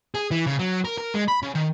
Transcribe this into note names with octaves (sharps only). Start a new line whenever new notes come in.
G#4
E3
C#3
F#3
A#4
A#4
G#3
B5
C#3
D#3